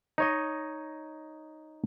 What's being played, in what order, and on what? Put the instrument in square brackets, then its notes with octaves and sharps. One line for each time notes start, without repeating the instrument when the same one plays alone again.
[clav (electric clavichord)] D#4 C#5 D#5